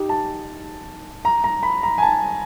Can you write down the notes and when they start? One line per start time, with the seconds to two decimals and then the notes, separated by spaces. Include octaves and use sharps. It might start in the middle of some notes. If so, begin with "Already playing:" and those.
Already playing: D#4 G4
0.09 A5
1.25 A#5
1.44 A#5
1.63 B5
1.83 A#5
1.98 G#5
2.03 A5